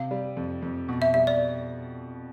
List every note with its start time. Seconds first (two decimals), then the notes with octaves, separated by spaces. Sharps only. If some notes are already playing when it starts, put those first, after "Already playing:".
Already playing: C3 F5
0.11 G3
0.37 F2
0.62 F2
0.88 B2
1.02 E5
1.14 G3 E5
1.27 D5